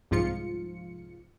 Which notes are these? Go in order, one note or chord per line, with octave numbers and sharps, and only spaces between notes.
C2 G#2 F3 F4 C#7